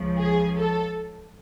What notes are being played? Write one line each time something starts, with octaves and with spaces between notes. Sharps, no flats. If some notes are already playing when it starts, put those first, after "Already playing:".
Already playing: C#2 C#3 F3
G#4
A4